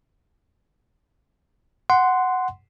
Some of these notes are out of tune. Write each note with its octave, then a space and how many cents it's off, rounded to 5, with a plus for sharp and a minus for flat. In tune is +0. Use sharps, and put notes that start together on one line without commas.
F#5 +0 C6 -10